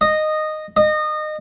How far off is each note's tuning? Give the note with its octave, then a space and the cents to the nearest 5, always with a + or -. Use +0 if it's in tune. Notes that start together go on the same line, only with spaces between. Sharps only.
D#5 -10
D#5 -25